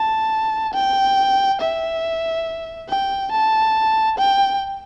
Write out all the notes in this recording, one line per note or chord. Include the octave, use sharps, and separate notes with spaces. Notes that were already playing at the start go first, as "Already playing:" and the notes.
Already playing: A5
G5
E5
G5
A5
G5